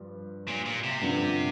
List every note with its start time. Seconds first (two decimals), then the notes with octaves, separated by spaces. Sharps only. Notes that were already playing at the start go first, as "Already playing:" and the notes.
Already playing: G2 F3
0.48 A#2
0.66 A#2
0.84 C3
1.01 G2 D3 F3